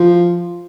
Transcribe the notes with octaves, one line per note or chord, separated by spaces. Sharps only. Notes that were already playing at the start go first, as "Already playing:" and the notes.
Already playing: F3